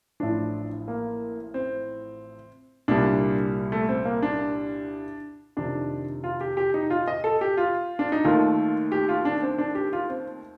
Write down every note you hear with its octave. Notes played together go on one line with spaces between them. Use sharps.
A1 A2 F3 D4
A#3
C4
C2 A#2 G3 D4
A3
C4
A#3
D4
F2 C3 D#3 D4
F4
G4
G4
D#4
F4
D#5
A4
G4
F4
D4
D#4
D#2 D#3 A3 F4
G4
F4
D4
C4
D4
G4
F4
C4